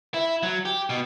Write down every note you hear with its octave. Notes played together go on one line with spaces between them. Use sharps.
E4
F#3
G4
B2